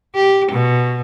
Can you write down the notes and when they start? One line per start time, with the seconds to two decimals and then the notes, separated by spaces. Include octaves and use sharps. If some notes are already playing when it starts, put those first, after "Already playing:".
0.15 G4
0.51 B2